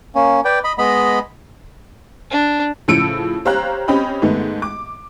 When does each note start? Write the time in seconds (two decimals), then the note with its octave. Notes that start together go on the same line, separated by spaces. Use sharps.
0.15 A#3 C#4
0.45 B4 D5 G5
0.64 D#5 B5
0.78 G#3 B3 D#5 B5
2.31 D4
2.88 A2 C#3 F3 E6 C#7 D7
3.45 G4 C5 C#5 F5 A#5 F#6
3.88 C4 C#4 G4 D#5 G5 B5
4.22 G#2 D#3 A3 B3
4.62 D6